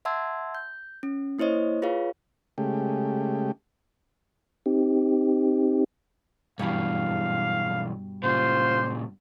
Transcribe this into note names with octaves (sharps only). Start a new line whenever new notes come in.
E5 F#5 A5 C6 E6 G#6
G6
C#4
A#3 E4 C5 C#5 D#5
F4 G#4 B4 C#5 F5
C#3 G#3 A3 G4
C4 D#4 G4
B1 G2 B2 E3 F5 B5
A#2 C#3 F4 C5